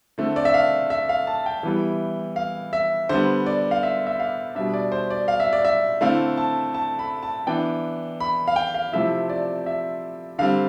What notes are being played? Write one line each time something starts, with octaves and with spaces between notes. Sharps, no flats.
D3 A3 C4
D5
E5
F5
E5
F5
A5
G5
E3 G3 B3 E4
F5
E5
D3 G3 B3 C5
D5
F5
E5
E5
F5
B2 G3 D4 E5
D5
C5
D5
F5
E5
D5
E5
D3 A3 C4 E4 F5
A5
A5
B5
A5
E3 B3 D4 G5
B5
F5
G5
F5
C3 F3 A3 C4 E4 E5
D5
E5
D3 G3 C4 F5